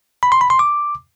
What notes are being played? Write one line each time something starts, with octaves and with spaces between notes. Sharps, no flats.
B5
C6
B5
C6
D6